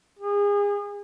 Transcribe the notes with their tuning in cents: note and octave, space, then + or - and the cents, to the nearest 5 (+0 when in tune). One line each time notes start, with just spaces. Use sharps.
G#4 -35